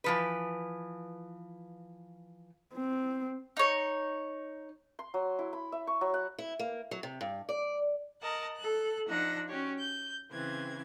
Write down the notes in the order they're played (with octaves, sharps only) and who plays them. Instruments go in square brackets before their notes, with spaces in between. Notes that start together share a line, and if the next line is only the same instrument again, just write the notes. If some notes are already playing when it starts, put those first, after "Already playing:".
[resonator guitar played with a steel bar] E3 F3 B4
[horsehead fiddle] C4
[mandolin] D#4 C#5
[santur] C6
F#3
E4
B5
E5
C#6
F#3
F#5
[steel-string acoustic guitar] E4
A#3
F#3
C3
G2
D5
[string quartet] A#4 D#5 F#5 A5
A4 F#6
F3 D4 D#4 F#5 E6 A#6
C#4 F#4 G4 C#5
G6
C#3 E3 C4 G#6